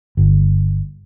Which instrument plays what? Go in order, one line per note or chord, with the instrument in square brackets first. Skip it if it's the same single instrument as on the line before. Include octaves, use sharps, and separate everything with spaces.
[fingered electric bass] G1